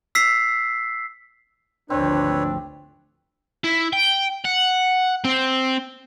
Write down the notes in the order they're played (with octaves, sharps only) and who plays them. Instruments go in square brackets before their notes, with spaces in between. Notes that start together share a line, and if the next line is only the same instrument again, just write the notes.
[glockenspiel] E6 B6 C7
[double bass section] G#1 D2 F3 [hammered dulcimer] C4 [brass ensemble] D4 [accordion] B4 C#5
[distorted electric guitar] E4
G5
F#5
C4